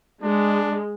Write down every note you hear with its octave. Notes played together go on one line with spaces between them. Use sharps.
G#3 D4